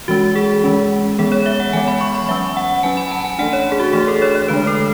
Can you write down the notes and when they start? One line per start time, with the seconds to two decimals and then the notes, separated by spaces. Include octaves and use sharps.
0.08 E3 G#3 C#4 F#4
0.35 G#4
0.64 E3 G#3 C#4
1.18 E3 G#3 B3 G#4
1.32 C#5
1.46 E5
1.60 F#5
1.73 E3 G#3 B3 G#5
1.88 B5
2.01 C#6
2.14 B5
2.29 F#3 C#4 E5
2.57 F#5
2.83 F#3 C#4 G#5
2.97 B5
3.11 A5
3.25 G#5
3.39 E3 A3 D4 F#5
3.53 C#5
3.72 G#4
3.80 F#4
3.93 E3 A3 D4 G#4
4.08 A4
4.22 C#5
4.35 C#5
4.48 D3 G#3 D4 B4
4.67 A4